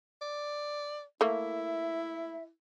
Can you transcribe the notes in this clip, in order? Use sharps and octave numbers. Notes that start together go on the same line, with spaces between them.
D5
A3 A#3 E4 E5